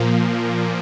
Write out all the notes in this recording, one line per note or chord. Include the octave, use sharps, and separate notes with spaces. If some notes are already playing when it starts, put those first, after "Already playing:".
Already playing: A#2 F3 A#3